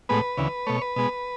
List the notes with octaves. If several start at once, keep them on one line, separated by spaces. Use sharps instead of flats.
A2 G#3 B3 B4
D2 C#3 E3
B2 A3 C#5
B4
B2 G#3 B3